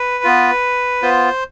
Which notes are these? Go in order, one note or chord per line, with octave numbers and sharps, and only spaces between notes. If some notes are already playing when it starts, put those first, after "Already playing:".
Already playing: B4
B3 F4
B3 F4 C5